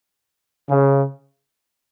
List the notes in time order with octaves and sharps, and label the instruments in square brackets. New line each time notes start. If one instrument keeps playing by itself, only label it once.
[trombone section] C#3